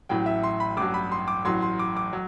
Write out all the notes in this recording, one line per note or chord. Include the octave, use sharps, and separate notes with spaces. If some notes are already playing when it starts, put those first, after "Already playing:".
A1 A2 F#3 G5
E5
C6
B5
A1 G2 F#3 D6
B5
C6
D6
A1 A2 F#3 C6
C6
D6
D6
F#3